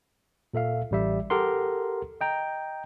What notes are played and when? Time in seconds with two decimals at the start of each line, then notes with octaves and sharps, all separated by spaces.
0.54 A#2 A4 E5 F5
0.91 A1 G3 E5
1.30 G4 A4 A#4 F#5 C6
2.21 D#5 G5 A#5